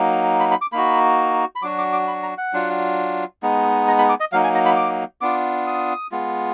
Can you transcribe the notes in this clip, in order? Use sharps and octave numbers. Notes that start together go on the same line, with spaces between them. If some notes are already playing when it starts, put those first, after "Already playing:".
Already playing: F#3 A#3 D#4
B5
B5
D6
A#3 D#4 F#4 B5
B5
F#3 D4 F#4 D6
D6
D6
B5
A#5
F#5
F#3 D4 F4
G#3 B3 D#4
A#5
B5
D6
D#5
F#3 A#3 D#4 F5
G#5
A#5
B5
D6
B3 D4 F4 D6
D#6
G#3 B3 F4